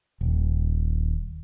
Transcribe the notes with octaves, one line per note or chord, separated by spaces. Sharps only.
D#1